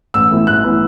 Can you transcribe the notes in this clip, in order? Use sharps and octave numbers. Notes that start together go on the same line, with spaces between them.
A1 E6
A2 E3 B3 E4
A1 F#6
A2 E3 B3 E4